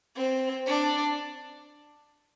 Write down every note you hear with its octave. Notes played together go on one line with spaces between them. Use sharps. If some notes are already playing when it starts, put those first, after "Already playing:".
C4
D4